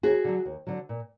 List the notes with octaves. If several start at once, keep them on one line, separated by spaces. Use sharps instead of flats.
D#2 F#4 G#4
D3 F#3
D#2
D3 F#3
A#2